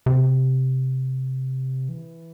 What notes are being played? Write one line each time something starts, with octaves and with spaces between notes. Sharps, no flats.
C3
E3